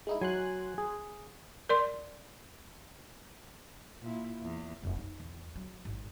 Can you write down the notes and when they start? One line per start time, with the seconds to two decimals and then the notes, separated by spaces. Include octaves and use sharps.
0.07 G#3 D#4 E4
0.21 F#3 G#5 C6 F#6
0.78 G#4
1.69 A#4 D5 C6
4.01 A#2 E4
4.42 E2
4.83 F1
4.99 D#4
5.20 E2
5.56 F#3
5.85 G#1